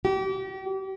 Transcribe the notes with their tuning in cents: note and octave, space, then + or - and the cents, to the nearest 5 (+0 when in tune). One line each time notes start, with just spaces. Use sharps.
G4 -35